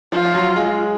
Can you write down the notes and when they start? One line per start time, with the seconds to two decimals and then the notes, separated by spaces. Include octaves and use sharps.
0.12 F3 F4
0.25 F3
0.34 F#3
0.56 G#3